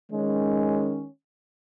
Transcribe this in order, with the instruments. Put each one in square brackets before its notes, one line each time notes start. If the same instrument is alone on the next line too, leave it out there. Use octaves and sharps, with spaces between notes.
[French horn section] D#3 G#3 C#4